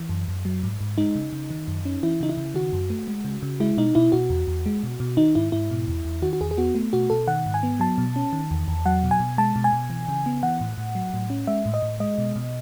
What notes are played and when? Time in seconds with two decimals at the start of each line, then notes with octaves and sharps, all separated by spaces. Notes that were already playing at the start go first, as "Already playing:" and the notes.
Already playing: E3
0.09 F#2
0.28 F#2
0.45 F#3
0.63 G#2
0.81 G#2
0.98 G#3 D#4
1.15 C#3
1.33 C#3
1.51 D#3
1.68 F#2
1.85 C#4
2.03 E3 E4
2.21 C#3 D#4
2.29 E4
2.37 C#3
2.54 D#3 F#4
2.73 F#2
2.90 A3
3.08 G#3
3.25 C#3
3.43 C#3
3.60 G#3 E4
3.77 B2 D#4
3.95 B2 E4
4.12 B2 F#4
4.30 E2
4.47 E2
4.66 G#3
4.83 B2
5.00 B2
5.17 D#3 D#4
5.35 G#2 E4
5.52 G#2 E4
5.71 B2
5.88 E2
6.05 E2
6.22 D#3 F#4
6.33 F#4
6.41 E2 G#4
6.51 G#4
6.58 B3 F#4
6.75 A3
6.93 B2 F#4
7.10 B2 A4
7.27 D#3 F#5
7.46 G#2
7.54 G#5
7.63 B3
7.80 F#3 A5
7.98 B2
8.16 C#4
8.33 D#3
8.51 E2
8.68 E2
8.86 F#3 F#5
9.03 B2
9.11 G#5
9.20 B2
9.38 G#3 A5
9.56 B2
9.64 G#5
9.73 B2
9.90 E3
10.08 C#3
10.26 B3
10.43 E3 F#5
10.61 A2
10.78 A2
10.95 F#3
11.14 A2
11.30 C#4
11.47 G#3 E5
11.66 A2
11.74 D#5
11.82 A2
12.00 G#3 D#5
12.18 B2
12.36 B2